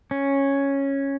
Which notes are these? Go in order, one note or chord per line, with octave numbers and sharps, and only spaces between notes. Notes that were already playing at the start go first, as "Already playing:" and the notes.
C#4